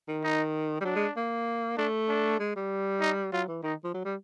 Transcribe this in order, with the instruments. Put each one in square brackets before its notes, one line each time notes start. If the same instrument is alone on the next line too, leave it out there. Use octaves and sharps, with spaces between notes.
[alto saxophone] D#3
[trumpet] D#4
[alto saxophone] G3
[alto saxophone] F#3 [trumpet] D4
[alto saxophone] G#3
A#3
[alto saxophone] A3 [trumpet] D4
[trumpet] D4
[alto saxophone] G#3
G3
[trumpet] D#4
[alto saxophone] F#3 [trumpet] F4
[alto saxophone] E3
[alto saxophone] D#3 [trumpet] D#4
[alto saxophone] F3
F#3
G3